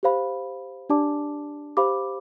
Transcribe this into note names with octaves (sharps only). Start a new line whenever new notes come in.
G4 C5 F5 B5
D4 G4 D5 A5 D6
G4 C5 F5 B5 D6